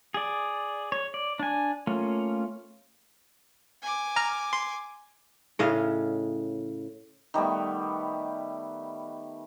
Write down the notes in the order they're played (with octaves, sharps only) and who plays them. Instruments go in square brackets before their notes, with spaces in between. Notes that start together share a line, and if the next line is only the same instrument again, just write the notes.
[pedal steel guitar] G#4 D5
C#5
D5
D4 G#5
A3 A#3 C#4 F4
[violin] G#5 D6
[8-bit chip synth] A#5 F6
C6
[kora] A2 C#3 D#5 F5
[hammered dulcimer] D#3 G3 A3 B3